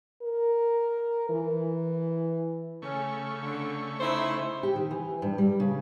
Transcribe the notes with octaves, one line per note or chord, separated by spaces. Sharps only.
A#4
E3
C#3 A3 C#4 C#6
D3
D#4 E4 C5
G4
D#3
E3
G2
G3
C#3